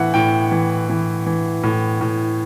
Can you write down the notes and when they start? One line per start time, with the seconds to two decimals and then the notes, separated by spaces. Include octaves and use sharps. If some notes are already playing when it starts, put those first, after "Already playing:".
Already playing: A2 E3 E5 F#5
0.14 A2 G5
0.51 E3
0.90 E3
1.26 E3
1.63 A2
2.01 A2